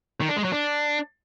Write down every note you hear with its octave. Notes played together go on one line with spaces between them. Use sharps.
D#3
D4
G#3
F#3
D4